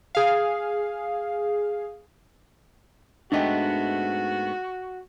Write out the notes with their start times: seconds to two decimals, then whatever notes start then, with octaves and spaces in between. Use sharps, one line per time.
0.15 G#4 F5
3.32 G#2 A3 B3 D4 F#4 D#5 G5